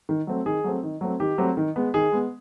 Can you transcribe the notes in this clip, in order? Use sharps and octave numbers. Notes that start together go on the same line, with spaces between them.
D#3
F#3 A3 C4
D#3 G#4
F#3 A3 C4
D#3
F#3 A3 C4
D#3 G4
F#3 A3 C4
D#3
G#3 B3
D#3 G#4
G#3 B3